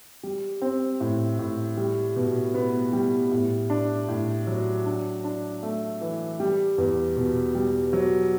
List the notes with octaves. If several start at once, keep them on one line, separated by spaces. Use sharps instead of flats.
G3
C4
A2
A2
G3
B2
B3
G3
A2
D4
A2
F#3
D4
D4
A3
E3
G3
E2
B2
G3
F#3